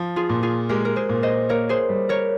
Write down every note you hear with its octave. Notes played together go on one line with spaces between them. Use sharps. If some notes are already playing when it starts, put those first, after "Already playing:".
Already playing: F3
F4 G#4
A#2
F4 G#4
G#3 G4 A#4
A#4
G#4 C5
A#2
C5 D#5
A#3 A#4 C#5
G#4 C5
G3
A#4 C#5